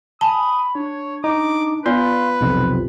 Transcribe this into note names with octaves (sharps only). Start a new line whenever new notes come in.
G#5 A5 B5 D#6
D4 C#5
D#4 D6
B3 F4 B4 D5 F5 C6
B1 F2 C3